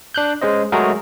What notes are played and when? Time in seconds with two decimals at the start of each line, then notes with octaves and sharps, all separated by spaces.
0.14 D4 F#6 G6
0.41 G#3 C#4 C5 D#5
0.72 F#3 G#3 A3 F#4 G#4 A#4